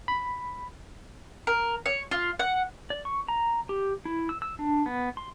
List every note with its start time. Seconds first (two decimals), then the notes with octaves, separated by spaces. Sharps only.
0.08 B5
1.47 A#4
1.86 C#5
2.11 F4
2.39 F#5
2.90 D5
3.05 C#6
3.28 A#5
3.69 G4
4.05 E4
4.29 E6
4.42 E6
4.59 D4
4.86 B3
5.17 C6